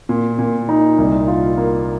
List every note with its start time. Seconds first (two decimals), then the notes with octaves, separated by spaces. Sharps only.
0.09 A#2
0.38 A#2
0.69 D#4
0.98 C2
1.28 F4
1.57 A#3